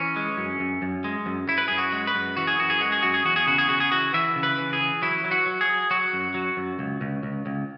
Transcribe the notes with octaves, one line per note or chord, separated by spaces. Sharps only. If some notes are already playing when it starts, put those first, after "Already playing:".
Already playing: E3 C#4
G#3
F#2
F#2
F#2
G#3
F#2
F#2 E4
B4
F#2 G#4
F#4
G#3
B4
F#2
E3 F#4
G#4
F#2 F#4
G#4
G#3 F#4
G#4
F#2 F#4
G#4
E2 F#4
G#4
C#3 F#4
G#4
C#3 F#4
G#4
E3 F#4
E3 E5
C#3
B4
E3
G#4
E3
F#3 E4
F#3
F#4
F#3
G#4
F#3
F#3 F#4
F#2
F#3
F#2
C#2
C#2
C#2
C#2